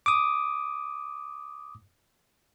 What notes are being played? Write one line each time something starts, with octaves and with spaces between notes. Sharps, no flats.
D6 D#6